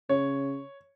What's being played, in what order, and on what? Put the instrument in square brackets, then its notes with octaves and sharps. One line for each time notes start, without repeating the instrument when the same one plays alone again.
[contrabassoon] C#3 [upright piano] C#5